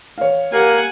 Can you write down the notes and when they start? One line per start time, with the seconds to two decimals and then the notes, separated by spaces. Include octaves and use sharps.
0.18 C#5 F5
0.52 A#3 G4 F#5 G#5